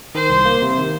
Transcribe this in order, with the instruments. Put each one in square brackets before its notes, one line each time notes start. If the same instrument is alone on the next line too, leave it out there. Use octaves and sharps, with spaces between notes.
[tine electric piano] D#3 [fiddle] C5
[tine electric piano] C2
A#3
C3
D#3